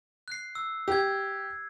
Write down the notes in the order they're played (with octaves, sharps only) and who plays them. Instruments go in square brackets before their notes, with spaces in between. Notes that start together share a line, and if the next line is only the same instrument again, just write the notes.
[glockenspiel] F#6 C7
E6
[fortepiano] G4 [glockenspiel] E6 G#6